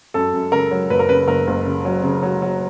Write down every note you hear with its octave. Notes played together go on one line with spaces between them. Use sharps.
F#2 A4
F#2
C#3 A#4
F#3
F#1 B4
A#4
C#3 B4
F#1 A#4
F#1
C#3
F#3
C#3
F#3
F#3